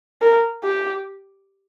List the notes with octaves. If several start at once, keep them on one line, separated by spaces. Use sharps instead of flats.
A#4
G4